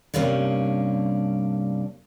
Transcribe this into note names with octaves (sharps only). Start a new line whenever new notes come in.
G2 C3 A#3 C#4 D4